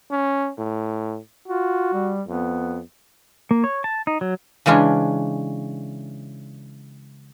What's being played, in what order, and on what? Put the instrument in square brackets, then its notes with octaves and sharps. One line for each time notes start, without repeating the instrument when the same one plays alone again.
[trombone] C#4
A2
[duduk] F4 [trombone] F#4
[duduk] G3
[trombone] F2 [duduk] B3
[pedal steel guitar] A#3
C#5
A5
D#4
F#3
[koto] C#3 E3 G#3 C#4 D4